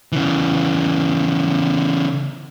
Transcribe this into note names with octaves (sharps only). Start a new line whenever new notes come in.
C#3 E3